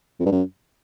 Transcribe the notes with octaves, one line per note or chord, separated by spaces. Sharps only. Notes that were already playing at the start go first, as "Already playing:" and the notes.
F2
G2
F#2